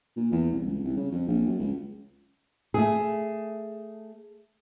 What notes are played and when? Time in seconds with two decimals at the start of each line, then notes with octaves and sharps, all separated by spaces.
0.17 A#2
0.32 E2
0.53 C2
0.66 C#2
0.84 C2
0.97 C#3
1.12 F2
1.28 A#1
1.47 F#2
1.60 C#2
2.74 A3 G#4